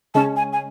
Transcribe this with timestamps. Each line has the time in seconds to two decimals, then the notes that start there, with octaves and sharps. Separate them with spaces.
0.15 C#3 G#3 C#4 A5
0.36 G#5
0.53 G#5